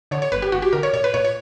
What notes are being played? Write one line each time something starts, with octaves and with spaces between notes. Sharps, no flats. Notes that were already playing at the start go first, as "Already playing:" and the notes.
D3 C#5
C#5
G1 B4
G4
G1 F#4
G4
D3 A#4
C#5
A#2 C#5
B4
A#2 C#5
C#5